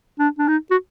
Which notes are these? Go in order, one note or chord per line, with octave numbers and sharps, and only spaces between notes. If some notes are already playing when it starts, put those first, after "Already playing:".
D4
D4
D#4
F#4